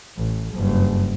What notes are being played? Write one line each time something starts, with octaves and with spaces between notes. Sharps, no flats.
A1
F#1 G2